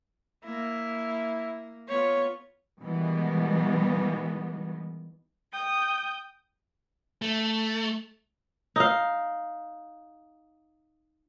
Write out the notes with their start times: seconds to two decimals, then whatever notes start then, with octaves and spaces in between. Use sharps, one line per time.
0.45 A#3 E4
1.89 B3 F4 C#5
2.81 B2 D#3 E3 G3 G#3 B3
5.52 G5 D#6 G6
7.22 A3
8.76 D#4 F5